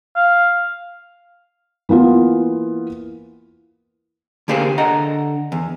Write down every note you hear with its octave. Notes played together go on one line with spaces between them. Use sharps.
F5
E3 A#3 B3 F4
D3 A#3 G4 G#4 C5
D3 D#5 F#5 A#5
E2